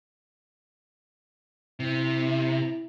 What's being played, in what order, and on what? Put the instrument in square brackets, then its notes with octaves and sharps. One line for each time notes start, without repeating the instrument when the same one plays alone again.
[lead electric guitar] C3 [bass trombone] E4